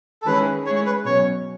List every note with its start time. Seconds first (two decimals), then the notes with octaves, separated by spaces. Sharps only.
0.22 A4
0.26 D#3 G#3 C#4 E4 G#4 B4
0.66 G#3 C#4 E4 G#4 C#5
0.76 C#5
0.86 B4
1.06 B2 F#3 C#4 C#5